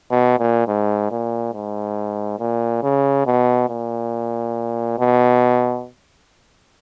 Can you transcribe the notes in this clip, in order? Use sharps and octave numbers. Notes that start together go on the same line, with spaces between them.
B2
A#2
G#2
A#2
G#2
A#2
C#3
B2
A#2
B2